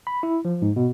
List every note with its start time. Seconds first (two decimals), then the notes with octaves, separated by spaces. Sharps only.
0.07 B5
0.23 E4
0.45 F3
0.62 G#2
0.76 B2